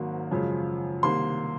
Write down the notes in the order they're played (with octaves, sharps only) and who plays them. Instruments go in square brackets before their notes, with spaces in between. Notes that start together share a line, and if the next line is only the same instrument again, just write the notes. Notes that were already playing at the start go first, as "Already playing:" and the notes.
Already playing: [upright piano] G#1 G#2 D#3 F#3 A#3
F#2 C#3 F3 G#3
C2 C3 D#3 A#3 C6